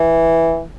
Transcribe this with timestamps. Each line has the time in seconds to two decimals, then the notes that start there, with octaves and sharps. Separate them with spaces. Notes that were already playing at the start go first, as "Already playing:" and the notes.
Already playing: E3